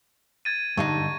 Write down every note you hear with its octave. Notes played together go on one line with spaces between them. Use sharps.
G#6 A6 D#7
G2 D3 D#4 C#6